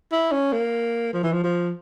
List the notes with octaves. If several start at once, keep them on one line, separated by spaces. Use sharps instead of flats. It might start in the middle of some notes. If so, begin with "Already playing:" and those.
E4
C#4
A#3
F3
E3
F3
F3